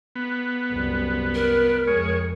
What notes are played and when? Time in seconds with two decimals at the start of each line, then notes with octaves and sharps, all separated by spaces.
0.16 B3
0.72 C2 F#2
1.35 A#4
1.87 F2 G#3 C#5